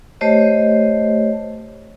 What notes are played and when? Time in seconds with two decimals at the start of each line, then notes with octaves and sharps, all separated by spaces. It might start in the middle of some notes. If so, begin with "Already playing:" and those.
0.21 A3 G4 C5 C#5 D#5